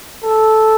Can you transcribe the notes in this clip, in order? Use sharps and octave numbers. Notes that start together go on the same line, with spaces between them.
A4